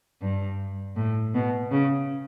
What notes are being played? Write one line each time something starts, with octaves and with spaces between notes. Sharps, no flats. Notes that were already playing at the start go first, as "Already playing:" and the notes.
G2
A2
B2
C#3